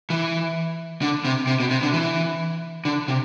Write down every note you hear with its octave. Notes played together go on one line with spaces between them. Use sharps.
E3
D3
C3
C3
B2
C3
D3
E3
D3
C3